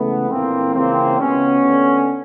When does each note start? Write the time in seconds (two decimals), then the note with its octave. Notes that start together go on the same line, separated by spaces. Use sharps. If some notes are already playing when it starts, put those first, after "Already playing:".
Already playing: C#2 C#3 E3 A3 B3
0.29 A#1 A2 E3 A#3 C4
0.74 C#2 C#3 E3 A#3 C4
1.18 C#2 B2 B3 C#4
1.63 D2 D3